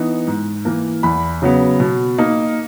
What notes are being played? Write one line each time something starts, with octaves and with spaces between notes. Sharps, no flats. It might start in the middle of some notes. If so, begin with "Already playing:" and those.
Already playing: E3 B3 D#4
G#2
E3 A#3
E2 B5
C#3 F#3 B3
B2
A#3 D#4